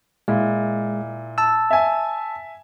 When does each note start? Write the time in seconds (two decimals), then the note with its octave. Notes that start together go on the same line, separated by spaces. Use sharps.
0.28 A#2 G#3 E4
1.38 A5 E6
1.70 E5 G#5